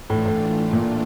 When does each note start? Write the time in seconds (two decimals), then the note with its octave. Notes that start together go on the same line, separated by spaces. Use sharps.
0.09 A2 E3 A3 D4 F4
0.26 A2
0.73 A#2